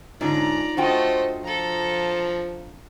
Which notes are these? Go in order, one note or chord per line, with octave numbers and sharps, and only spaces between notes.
G#2 D3 C#4 D#4 F4 D5 A#5
A3 D4 F4 F#4 C5 D#5 G5
F3 A4 A#5